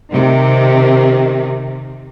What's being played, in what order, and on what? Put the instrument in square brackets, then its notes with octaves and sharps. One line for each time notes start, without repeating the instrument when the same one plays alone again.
[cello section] C3 D#3